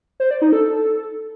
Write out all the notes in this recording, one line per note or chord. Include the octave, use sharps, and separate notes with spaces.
C5
D5
D#4
A4